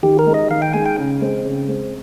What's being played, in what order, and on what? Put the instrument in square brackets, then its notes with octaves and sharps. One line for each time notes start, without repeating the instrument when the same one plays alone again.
[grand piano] D#3 [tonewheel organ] G4
[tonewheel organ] A#4
[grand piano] G#3 D#4
[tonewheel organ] D#5
[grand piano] D#3 [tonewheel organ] F5
[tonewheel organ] G5
[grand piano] G#3 D#4 [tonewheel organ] G#5
[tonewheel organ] G5
[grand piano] C#3
G#3 C4
C#3
G#3 C4